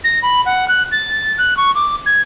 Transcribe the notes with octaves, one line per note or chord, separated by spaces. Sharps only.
A#6
B5
F#5
F#6
A6
F#6
C#6
D6
G#6